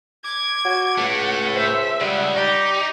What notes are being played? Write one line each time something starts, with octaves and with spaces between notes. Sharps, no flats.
D6 G#6
F#4
C#2 A2 A3 F#5
C5 E5
C#2 C#3 G3 F#5
D#4 G4 D5